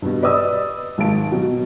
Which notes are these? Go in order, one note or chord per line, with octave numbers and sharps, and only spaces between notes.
G2 B2
B4 D5 D#5 D#6 E6
G#1 G#2 A5 D7
B2 F#3